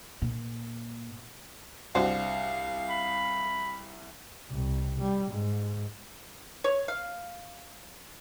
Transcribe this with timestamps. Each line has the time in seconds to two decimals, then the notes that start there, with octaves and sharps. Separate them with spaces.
0.22 A#2
1.95 C2 D4 F#4 C5 F5
2.89 B5
4.50 C2
5.00 G3
5.32 G#2
6.64 C#5
6.88 F5